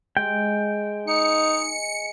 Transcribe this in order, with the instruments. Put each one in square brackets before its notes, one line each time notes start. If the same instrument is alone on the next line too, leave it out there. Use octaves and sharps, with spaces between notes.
[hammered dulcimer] G#3 [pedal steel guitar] G5
[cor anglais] D#4 [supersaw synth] C#7